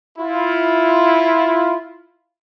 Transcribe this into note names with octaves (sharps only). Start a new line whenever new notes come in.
E4 F4